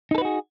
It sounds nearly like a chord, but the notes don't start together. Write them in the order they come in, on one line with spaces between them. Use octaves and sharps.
D#4 A4 B4 F#4 G#4